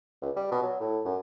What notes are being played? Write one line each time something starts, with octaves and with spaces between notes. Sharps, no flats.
C#2
G3
B2
F#3
A2
F#2